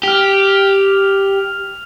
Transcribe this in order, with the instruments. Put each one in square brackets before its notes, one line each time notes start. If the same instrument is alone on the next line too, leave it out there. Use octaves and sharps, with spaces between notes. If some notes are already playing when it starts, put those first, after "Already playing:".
[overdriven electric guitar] G4 [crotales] F6 F7